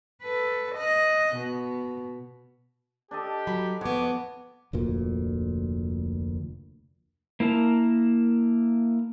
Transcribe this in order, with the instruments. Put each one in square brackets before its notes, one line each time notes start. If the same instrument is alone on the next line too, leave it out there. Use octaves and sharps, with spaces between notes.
[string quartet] A4 B4
D#5 F#6
B2
[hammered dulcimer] D4 A4 D#5 [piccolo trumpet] G4
[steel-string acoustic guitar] F#3 [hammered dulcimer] B5
[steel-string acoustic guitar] F2 B3 [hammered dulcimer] F#4 C#5 [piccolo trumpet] D6
[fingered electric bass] F1 D2 A#2
[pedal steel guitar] A#3 E4 A#4 A5 A#5